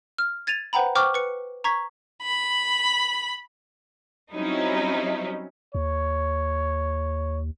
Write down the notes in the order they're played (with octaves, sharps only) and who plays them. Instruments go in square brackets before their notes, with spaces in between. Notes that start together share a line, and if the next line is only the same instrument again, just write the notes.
[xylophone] F6
G#6 A6 D#7 F7
B4 C5 F#5 G5 A#5 B5
C5 G5 C#6 D6 F6
B4 C#7
A#5 C#6 G#6 B6
[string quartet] B5
[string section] F#3 G3 C4 C#4 D#4 E4
[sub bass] D#2 [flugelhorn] C#5